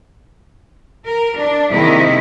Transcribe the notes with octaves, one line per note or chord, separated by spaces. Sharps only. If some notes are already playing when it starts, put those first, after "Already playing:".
A#4
D4
C3 D#3 G#3 A#3 E4 D#5